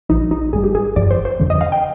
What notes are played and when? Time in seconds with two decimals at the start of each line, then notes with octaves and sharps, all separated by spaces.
0.09 A#1 A#2 F3 D#4
0.31 D#4
0.53 G#1 G#2 G3 G#4
0.64 G4
0.75 G#4
0.96 G1 G2 F3 D5
1.11 C5
1.25 C5
1.40 F2 D3 F3
1.50 D#5
1.61 F5
1.72 G5